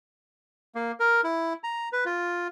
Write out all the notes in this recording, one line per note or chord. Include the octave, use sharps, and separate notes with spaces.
A#3
A#4
E4
A#5
B4
F4